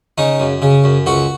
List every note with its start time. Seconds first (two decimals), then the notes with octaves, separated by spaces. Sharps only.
0.18 C#3 D#4
0.40 F#2
0.62 C#3
0.84 F#2
1.06 C#2 F#4